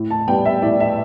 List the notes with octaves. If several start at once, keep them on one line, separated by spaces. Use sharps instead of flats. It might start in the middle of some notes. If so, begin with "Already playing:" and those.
Already playing: A2
A5
G3 B3 G5
E5
A2 D5
E5